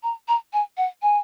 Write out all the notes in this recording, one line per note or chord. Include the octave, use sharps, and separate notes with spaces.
A#5
A#5
G#5
F#5
G#5